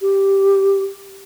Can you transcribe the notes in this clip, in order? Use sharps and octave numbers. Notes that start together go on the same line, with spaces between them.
G4